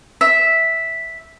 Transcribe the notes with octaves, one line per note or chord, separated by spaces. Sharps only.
E5